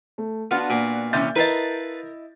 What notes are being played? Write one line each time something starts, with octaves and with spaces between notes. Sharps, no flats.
A3
B3 D4 F4 F#4 F#5 F6
A#2
C3 E3 C#4 E5 G6 A6
E4 A#4 B4 D#5 F5 A5